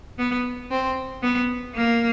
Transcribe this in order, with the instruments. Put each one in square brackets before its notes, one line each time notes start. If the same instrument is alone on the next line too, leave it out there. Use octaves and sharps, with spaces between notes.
[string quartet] B3
C4
B3
A#3